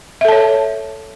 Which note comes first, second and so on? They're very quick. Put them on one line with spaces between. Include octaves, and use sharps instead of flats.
E5 A4 A5 C#5